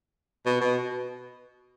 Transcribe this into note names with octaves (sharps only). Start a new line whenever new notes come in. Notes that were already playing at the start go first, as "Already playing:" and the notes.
B2
B2